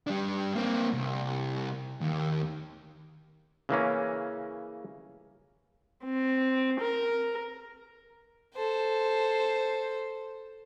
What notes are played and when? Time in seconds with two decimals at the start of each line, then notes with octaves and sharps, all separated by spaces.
0.07 G3 D4
0.55 A#3 C4
0.93 C2
2.01 D#2
3.69 C#3 E3 A#3 C#4
6.04 C4
6.80 A#4
8.55 A4 C5